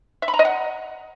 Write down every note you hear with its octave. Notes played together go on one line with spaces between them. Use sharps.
E5
B5
A#5
D#5
F#5